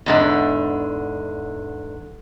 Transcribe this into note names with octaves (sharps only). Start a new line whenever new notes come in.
E2 G#2 D3